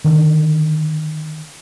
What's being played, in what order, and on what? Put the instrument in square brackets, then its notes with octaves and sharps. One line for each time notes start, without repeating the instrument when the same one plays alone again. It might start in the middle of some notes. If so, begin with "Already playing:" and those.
[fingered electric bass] D3 D#3 A#3 D4